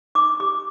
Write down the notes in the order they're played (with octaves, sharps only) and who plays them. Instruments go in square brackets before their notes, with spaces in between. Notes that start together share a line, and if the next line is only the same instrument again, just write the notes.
[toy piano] D#4 D6
G4 D6